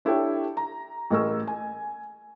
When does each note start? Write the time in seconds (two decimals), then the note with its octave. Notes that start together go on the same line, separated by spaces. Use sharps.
0.05 D4 E4 G4 A4 C#5 G5
0.57 A#5
1.10 A1 G#4 A#4 C#6 E6
1.47 G#5